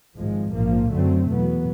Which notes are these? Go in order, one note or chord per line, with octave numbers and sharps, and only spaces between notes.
G#1 G#2 F3 G#3
A#1 G#2 F3 A#3
F#2 D3 F#3 A3 C4
E2 B2 F#3 B3